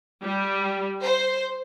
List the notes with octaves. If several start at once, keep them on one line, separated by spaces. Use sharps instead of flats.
G3
C5